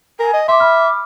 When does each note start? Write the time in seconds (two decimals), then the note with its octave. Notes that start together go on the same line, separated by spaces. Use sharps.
0.20 A#4 G#5
0.34 D#5
0.48 E5 C6 D6
0.60 B5 F6